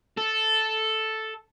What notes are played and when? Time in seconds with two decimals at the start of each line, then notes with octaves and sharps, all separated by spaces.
0.17 A4